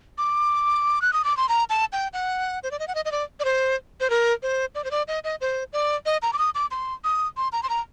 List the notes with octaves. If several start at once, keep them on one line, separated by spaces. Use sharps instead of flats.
D6
F#6
D#6
D6
C6
A#5
A5
G5
F#5
C5
D5
D#5
F#5
D#5
D#5
D5
D5
C5
C5
A#4
C5
D5
C5
D5
D#5
D#5
C5
D5
D#5
A#5
D6
D#6
D6
C6
D#6
C6
A#5
C6
A#5